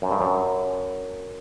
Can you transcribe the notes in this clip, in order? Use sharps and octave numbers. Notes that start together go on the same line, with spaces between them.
F#2
G2
F#2